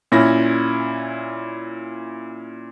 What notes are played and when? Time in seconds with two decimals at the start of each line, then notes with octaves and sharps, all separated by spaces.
0.12 A#2 C#4 E4 A#6